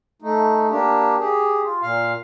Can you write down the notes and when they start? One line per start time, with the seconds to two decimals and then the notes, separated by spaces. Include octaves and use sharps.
0.22 A3 D#4
0.70 A#3 D4 G4
1.20 G4 G#4
1.64 F4
1.82 A#2 F5